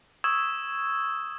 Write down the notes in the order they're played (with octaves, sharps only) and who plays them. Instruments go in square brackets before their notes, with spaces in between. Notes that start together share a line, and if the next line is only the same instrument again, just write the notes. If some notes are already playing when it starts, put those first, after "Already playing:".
[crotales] C#6 D#6 E6 G#6 E7